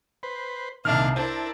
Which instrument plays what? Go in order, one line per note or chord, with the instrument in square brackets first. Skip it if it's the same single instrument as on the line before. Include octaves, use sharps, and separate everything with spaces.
[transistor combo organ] B4 C5
[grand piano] C2 E5 F6 [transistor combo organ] A#2 D#3 [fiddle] D4 F5
[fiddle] D4 A#4 [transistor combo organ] E4 A5 [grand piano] C5